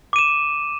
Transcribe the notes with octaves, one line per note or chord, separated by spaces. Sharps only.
D6 D#7 E7